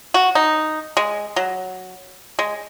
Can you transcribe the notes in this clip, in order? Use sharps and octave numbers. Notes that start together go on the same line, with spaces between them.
F#4
D#4
G#3
F#3
G#3